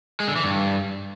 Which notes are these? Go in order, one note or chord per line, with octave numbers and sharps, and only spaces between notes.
G#3
D3
E3
G2